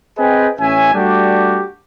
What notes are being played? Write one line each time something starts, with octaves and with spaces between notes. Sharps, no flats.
C4 G#4 B4 D#5 G5 G#5
A1 C#4 E5 G#5
G3 A3 D4 F#4 G4